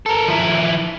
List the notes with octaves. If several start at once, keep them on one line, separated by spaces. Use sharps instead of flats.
A4 A#4
F3 E4